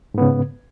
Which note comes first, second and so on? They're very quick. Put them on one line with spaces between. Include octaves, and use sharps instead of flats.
G#2 B3 C#3